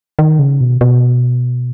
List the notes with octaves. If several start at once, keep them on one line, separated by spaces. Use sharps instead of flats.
D#3
C#3
B2
B2